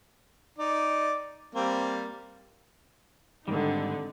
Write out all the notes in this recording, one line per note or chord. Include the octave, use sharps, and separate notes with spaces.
D#4 D5
G3 A#3 C4
G#2 D3 D#3 G3 C4 D#4